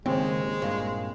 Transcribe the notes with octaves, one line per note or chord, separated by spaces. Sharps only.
D#2 G#2 C#3 G#3 C4
G2 A#2